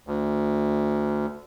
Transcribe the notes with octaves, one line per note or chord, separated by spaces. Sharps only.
D2